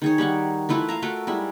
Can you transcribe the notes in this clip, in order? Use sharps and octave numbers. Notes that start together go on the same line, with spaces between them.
D#3 G#4 C#5
G3 D#4 F#5 C#6
E3 A3 E4 F4
E5 F5 A#5
A3 F4 F#4 A#4
G3 G#3 E4